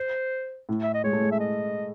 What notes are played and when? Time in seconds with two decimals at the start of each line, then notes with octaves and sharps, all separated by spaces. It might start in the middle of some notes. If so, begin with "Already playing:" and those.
Already playing: C5
0.69 A2
0.83 E5
0.94 D#5
1.04 G#3 C#5
1.13 A3
1.22 G#3
1.31 E5
1.40 D#5